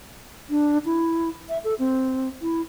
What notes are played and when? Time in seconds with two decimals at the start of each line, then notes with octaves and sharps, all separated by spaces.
0.50 D4
0.85 E4
1.49 E5
1.64 A4
1.79 C4
2.42 E4